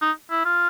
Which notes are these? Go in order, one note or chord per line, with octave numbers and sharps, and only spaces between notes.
D#4
E4
F4